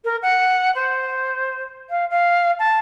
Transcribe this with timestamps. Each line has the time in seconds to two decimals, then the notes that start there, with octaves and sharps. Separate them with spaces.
0.04 A#4
0.22 F#5
0.75 C5
1.89 F5
2.10 F5
2.59 A5